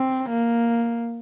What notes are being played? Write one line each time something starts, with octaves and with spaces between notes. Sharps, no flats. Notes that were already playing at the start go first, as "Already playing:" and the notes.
Already playing: C4
A#3